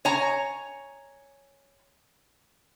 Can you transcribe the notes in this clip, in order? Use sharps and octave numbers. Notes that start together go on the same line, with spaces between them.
C#5 G#5 A#5